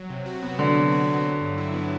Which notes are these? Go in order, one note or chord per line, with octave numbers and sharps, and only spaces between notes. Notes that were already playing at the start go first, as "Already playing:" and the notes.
Already playing: F#3
C3
F#4
B3
D3 F#3
C3
F#4
B3
F#3
G2
E4
B3